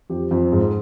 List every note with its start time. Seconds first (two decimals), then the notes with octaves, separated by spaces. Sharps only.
0.10 F2 G4
0.31 F2
0.52 G#2